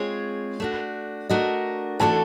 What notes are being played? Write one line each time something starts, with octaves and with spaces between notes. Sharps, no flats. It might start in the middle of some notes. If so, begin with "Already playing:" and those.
Already playing: G#3 C4 F4 G#4 C#5
A3 D4 F#4
A3 D4 F#4 A#4 D#5
E3 A3 D4 F#4 A4 A5